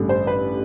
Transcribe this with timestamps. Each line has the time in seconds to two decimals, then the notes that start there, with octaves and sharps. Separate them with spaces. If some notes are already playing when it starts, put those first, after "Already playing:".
Already playing: A1 G2 D3
0.09 C5
0.27 B4